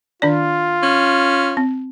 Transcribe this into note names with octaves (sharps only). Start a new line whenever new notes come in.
D#3 D4 F4 D5
C#4
C4